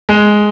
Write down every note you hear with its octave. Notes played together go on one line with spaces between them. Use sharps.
G#3